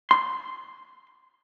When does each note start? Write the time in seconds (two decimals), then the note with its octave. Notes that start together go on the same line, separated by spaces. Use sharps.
0.11 C6